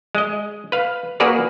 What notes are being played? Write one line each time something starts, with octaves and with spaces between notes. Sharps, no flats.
G#3 D#5
B4 F5
A#3 F#4 G#4 A#4 B4 D5